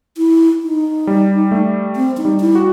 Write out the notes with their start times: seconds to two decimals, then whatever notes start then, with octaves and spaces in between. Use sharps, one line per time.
0.17 E4
0.63 D#4
1.07 G3
1.51 A3
1.96 C4
2.17 D#4
2.25 G3
2.40 E4
2.55 F#4